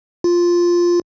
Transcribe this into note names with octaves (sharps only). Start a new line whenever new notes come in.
F4